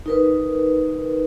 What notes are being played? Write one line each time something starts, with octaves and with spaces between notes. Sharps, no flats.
D#4 A#4 B4